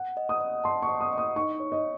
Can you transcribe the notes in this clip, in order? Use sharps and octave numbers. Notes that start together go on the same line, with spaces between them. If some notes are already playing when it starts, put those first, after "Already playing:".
Already playing: F#5
D#5
D#6
D#5
A5 C6
C#6
D#5
D#6
D#5
D#6
D#4 C#6
C#5
D#5